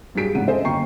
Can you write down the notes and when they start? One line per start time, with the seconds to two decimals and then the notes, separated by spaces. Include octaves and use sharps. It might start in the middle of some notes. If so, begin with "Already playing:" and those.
0.15 G2 F#3 G4 G#4 B6 D7
0.35 E2 G#2 C#3 F#5 D#7
0.47 A4 C5 D#5 E5 G#5
0.64 G1 F#2 A#3 G5 C#6 C7